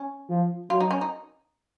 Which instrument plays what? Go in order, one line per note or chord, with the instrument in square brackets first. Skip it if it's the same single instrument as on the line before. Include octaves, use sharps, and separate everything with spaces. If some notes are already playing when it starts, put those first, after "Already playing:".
Already playing: [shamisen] C#4
[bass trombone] F3
[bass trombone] F#3 [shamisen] F4
[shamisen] D#4
C#4
D#4